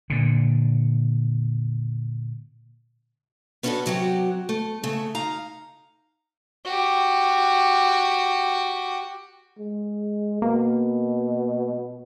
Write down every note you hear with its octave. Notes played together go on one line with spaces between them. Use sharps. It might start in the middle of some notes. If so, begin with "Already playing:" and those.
A#2 D3
B3 C#4 D4 F4 F#4 A4
C3 F#3 F#4 G4
A3
C#3 A3
D#4 F5 A#5
F#4 G4
G#3
B2 A#3